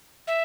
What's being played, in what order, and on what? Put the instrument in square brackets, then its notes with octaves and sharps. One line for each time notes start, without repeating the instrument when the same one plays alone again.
[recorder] E5